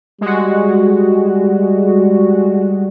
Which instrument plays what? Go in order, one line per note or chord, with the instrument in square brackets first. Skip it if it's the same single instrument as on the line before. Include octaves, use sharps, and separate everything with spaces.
[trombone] G3 [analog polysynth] G#3 F#4